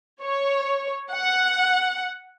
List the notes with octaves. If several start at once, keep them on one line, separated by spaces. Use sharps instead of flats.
C#5
F#5